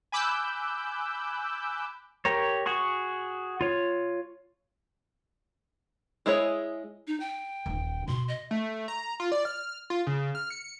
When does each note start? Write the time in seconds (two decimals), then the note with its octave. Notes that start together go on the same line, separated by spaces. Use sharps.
0.12 G#5 B5 D6 E6 F#6 G6
2.25 G4 A#4 C#5
2.66 F#4 G#4 C#6
3.61 F4 C#5
6.26 G#3 E4 G#4 C#5
7.07 D#4
7.20 G5
7.66 D#1 D#4
8.08 B2 C6
8.28 D#5
8.51 A3
8.88 A#5
9.20 F4
9.32 D5
9.45 F6
9.90 F4
10.07 C#3
10.35 F6
10.50 C#7